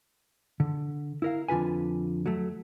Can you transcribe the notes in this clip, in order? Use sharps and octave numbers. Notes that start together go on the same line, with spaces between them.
D3
E4 A#4 F5
F2 D3 F4 B4 G#5
F#3 A3